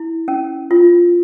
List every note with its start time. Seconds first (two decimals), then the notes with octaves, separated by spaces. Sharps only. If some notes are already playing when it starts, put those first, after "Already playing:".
Already playing: E4
0.28 C#4
0.71 F4